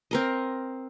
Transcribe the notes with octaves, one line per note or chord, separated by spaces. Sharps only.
C4 A#4 D#5